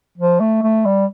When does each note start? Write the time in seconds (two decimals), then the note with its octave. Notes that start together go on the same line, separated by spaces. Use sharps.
0.18 F3
0.40 A3
0.62 A3
0.85 G3